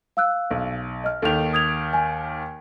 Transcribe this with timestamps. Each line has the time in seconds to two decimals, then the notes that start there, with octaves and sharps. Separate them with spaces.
0.17 F5 E6 F#6
0.51 B1
1.04 D#5 F6
1.22 D#2 D#3 A4 F7
1.53 D#6 G#6 F7
1.93 G#5